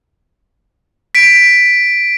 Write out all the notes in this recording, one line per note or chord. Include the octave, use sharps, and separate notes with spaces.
B6 D7